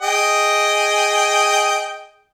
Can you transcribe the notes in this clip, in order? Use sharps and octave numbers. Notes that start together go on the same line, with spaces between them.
G#4 D#5 G5